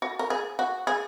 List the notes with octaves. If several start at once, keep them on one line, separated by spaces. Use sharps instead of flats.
F#4
A#4
G#4
F#4
G#4